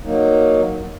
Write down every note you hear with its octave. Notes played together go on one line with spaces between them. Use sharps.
F#3 A#3 D#4